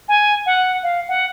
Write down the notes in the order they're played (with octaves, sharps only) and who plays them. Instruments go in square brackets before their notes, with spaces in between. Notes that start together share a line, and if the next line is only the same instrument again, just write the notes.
[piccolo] G#5
F#5
F5
F#5